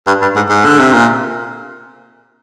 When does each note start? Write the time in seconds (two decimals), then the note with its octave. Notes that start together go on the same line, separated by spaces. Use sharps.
0.07 G2
0.22 G2
0.36 G#2
0.49 G#2
0.65 D3
0.79 C3
0.93 A#2